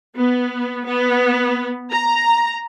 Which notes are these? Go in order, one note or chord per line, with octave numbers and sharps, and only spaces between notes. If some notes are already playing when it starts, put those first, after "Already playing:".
B3
B3
A#5